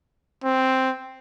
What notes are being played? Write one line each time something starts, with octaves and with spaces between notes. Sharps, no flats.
C4